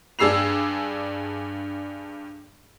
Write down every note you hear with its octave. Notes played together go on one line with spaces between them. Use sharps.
G2 D4 G#4 E6 C7 F7